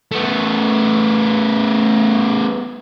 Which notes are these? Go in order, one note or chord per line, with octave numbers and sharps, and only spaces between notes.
A3 B3